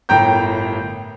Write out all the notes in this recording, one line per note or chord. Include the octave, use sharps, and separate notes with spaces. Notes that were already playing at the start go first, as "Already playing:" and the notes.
G1 A2 A#4 G5 A#5 G6